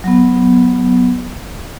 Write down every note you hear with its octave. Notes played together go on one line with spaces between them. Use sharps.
F#3 B3